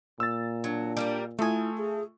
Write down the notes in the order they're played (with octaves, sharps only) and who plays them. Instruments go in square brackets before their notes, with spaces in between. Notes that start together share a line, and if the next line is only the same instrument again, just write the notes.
[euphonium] A#2 [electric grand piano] E6 A6
[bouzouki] F#3 [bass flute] D4
[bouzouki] G3 A#3 A#4
[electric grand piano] A3 F4 D#6 [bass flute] E4 [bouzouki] A4 G#5
[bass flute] G#4